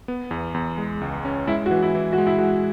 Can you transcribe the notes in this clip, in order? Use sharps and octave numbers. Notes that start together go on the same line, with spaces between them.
B3
E2
E2
G#3
C#2
C#4
G#3 E4
F#4
E3
E4
E3
F#4
G#3
E4
G#3 F#4